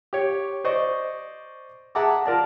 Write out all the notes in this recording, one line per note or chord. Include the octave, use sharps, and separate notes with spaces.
G4 C#5
C5 D5 D#5 C#6
G#4 E5 F#5 A5 A#5 D6
F4 A#4 D5 A5